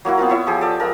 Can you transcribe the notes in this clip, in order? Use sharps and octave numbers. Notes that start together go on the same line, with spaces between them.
F#3 A#3 E4 F#4
B3 C4 F4 A#4
E4 C#5 E5
F3 G4 G#4
A4 D5 E5
F3 G#3 A#4